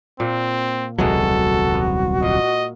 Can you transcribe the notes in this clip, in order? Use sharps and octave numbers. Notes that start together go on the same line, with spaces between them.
A#2 C4
D#1 C2 B2 E3 F#3 G#3 F#4 A4
B3
A#2 D#5